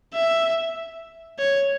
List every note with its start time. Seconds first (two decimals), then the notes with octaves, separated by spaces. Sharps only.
0.14 E5
1.39 C#5